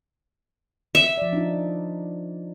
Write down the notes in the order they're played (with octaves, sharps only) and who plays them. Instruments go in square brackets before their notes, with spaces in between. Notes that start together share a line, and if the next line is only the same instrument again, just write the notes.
[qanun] E5
[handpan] F3 D5
D4 D#4 F4